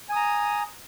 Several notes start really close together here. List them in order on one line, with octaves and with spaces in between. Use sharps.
G#5 D#6 A#5